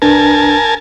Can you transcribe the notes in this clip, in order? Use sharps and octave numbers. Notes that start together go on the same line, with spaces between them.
C2 D4 A#4 B4 G#5 A5